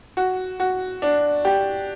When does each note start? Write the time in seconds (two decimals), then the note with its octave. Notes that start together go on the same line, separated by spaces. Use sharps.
0.17 F#4
0.60 F#4
1.02 D4
1.45 G4